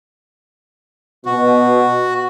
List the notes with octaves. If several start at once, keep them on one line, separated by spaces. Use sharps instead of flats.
B2 F#4